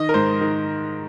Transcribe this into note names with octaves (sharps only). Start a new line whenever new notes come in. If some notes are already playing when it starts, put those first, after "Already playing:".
Already playing: D#3 D#5
A#4
G#2 C5
D#3